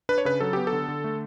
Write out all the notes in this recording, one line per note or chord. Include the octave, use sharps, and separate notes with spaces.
D4 B4
C#5
C#3 B4
F#3 A4
B3 G4
A4
D3
D3
A3